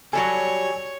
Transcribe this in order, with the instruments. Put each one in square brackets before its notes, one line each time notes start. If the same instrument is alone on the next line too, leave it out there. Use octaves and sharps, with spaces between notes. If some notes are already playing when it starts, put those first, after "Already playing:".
[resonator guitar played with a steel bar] F#3 G3 A4 [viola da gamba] C#5 [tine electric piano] G#5